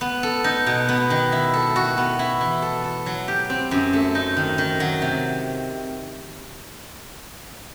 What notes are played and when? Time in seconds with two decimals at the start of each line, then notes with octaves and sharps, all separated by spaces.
0.01 B3
0.23 A4
0.44 D#4
0.66 B2
0.89 B3
1.10 D#3
1.32 E4
1.54 A4
1.76 F#4
1.97 B3
2.19 E4
2.41 E3
2.62 A4
2.84 A4
3.06 F#3
3.28 G4
3.50 C4
3.71 F#2
3.93 A3
4.15 D#4
4.36 D#3
4.58 D#3
4.80 F#3
5.02 C3